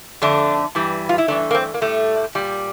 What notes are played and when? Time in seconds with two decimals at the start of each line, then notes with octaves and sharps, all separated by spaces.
0.22 F2 D3 A3 D4
0.75 G2 E3 G3
1.09 F4
1.18 E4
1.28 G2 E3 A3 D4
1.51 A#3
1.55 C4
1.74 A#3
1.81 A2 G3 A3
2.35 A#2 G3